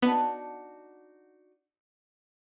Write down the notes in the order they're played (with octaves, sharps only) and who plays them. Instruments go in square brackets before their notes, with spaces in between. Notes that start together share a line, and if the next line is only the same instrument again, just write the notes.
[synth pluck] B3 [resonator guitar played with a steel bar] D4 D#4 F#4